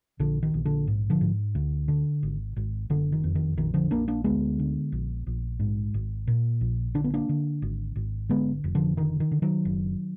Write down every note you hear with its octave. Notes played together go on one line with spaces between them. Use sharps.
A#1 D3
D#3
A#1
D3
G#2
D3 F3
G#2
D2
D3
G#1
G#1
F#1 D3
D#3
F2
D#3
A#1 D#3
D3 F3
A#1 A#3 D4
A#3 D4
D2 G#3 B3
D3
A#1
A#1
G#2
G#1
A#2
A#1
D3 D4
B3
A#3 D4
D3
G#1
G#1
D3 G#3 B3
F1
D3 F3
D3 D#3
D#3
D3
D#3 F#3
F#1